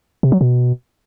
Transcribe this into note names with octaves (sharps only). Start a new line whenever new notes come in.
C3
F#3
B2